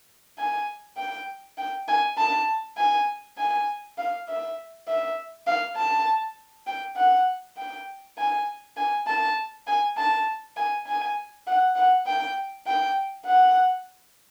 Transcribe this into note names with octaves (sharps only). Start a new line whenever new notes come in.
G#5
G5
G5
G#5
A5
G#5
G#5
F5
E5
E5
F5
A5
G5
F#5
G5
G#5
G#5
A5
G#5
A5
G#5
G#5
F#5
F#5
G5
G5
F#5